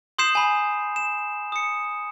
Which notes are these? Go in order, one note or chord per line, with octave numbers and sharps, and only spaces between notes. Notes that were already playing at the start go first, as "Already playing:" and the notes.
C6 D#6 G6 C7 E7
G#5 B5
E7
D#6 C#7